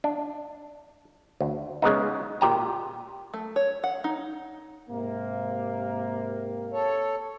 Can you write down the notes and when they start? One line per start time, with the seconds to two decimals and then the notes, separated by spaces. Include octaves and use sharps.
0.04 D4
1.41 D2
1.82 C#3 G#3 B3 D#4
2.41 A#2 G4 G5 A#5
3.34 A3
3.56 C#5
3.84 F#5
4.04 D#4
4.90 G#2 C3 A#3
6.73 A4 C#5